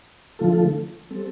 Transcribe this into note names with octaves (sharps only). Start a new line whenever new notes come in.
D3 F3 A3 F4 A4
G3 C4 A4